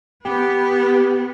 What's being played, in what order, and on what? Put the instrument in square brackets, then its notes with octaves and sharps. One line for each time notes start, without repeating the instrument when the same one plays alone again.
[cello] B3 B4 [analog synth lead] G4